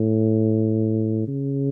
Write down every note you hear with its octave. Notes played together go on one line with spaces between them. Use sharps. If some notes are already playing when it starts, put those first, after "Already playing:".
Already playing: A2
C#3